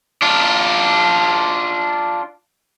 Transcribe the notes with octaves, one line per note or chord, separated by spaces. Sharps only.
D4 F4